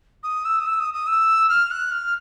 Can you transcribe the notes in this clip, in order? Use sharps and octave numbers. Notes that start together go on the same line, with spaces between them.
D#6
E6
D#6
E6
D#6
D#6
E6
F6
F#6
F6